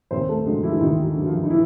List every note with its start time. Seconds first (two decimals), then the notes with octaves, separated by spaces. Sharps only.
0.11 D#2 C4 C5
0.29 A3 A4
0.46 D3 F#3 G#3 G#4
0.63 E3 E4
0.74 E4
0.80 D#2 D#3 D#4
1.15 D3 F#3
1.27 F3 F4
1.44 D#4
1.50 E3 E4